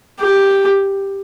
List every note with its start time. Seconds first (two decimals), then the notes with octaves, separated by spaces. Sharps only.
0.20 G4